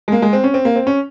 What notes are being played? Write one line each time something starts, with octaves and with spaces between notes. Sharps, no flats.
G#3
A#3
G#3
C4
C#4
C4
A#3
C4
C#4